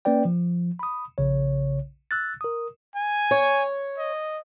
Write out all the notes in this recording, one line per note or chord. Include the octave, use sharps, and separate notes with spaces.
A#3 C#4 B4 D5 G5
F3
B5 D#6
A#1 C#3 C#5
E6 F#6 A6
A#4 D#6
G#5
C#5
D#5